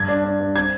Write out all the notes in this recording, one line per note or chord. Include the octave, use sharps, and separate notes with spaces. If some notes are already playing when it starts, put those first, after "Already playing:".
Already playing: G2 G#6
D4
D4
G2
C4 G#6